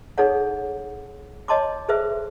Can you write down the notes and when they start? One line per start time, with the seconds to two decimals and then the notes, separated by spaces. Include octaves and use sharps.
0.18 D#4 G#4 A4 C#5 F#5
1.48 C#5 D#5 A5 C6 D6
1.88 G#4 A4 B4 C5 E5